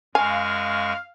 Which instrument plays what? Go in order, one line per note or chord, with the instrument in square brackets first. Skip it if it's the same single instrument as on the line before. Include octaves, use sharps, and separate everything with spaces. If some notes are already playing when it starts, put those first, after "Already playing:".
[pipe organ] F#2 G#3 C#6 [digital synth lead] F5 [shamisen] G#5